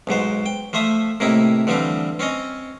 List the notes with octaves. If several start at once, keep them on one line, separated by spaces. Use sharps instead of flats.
B1 G#2 F#3 C5
G5
F3 A3 C5 E5 D#6
A2 C3 A#3 D#4 E4
D3 E3 F3 G3 C4 G4
C4 C#4 C#5 D#5